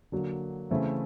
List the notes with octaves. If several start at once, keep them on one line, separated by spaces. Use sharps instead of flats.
D3 F#3 A#3
C#3 E3 A3 C4 E4